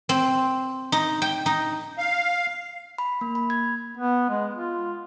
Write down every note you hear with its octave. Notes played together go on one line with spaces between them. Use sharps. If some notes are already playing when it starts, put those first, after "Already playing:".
C4
D#4
G5
D#4
F5
B5
A#3
B5
G#6
B3
G#3
F4